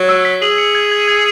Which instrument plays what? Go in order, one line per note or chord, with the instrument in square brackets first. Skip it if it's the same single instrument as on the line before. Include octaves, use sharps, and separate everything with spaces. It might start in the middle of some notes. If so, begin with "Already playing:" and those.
Already playing: [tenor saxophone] F#3 [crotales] G#6
[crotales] E6
B6
[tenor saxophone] G#4 [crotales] F#7
[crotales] C#7
G#6
G#6
G#6